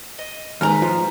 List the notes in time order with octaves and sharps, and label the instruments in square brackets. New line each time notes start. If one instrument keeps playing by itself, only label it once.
[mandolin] D#5
[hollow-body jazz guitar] D#2 G#2 [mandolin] B4 A#5 F6
[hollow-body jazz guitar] F3